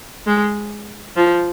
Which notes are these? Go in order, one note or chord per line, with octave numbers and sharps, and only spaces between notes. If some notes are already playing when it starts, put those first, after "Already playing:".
G#3
F3